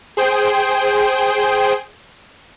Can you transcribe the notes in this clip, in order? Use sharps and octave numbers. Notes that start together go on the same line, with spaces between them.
G#4 C5 G5